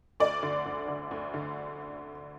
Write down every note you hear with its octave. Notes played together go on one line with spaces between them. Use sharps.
D2 D5
D3
D2
D3
D2
D3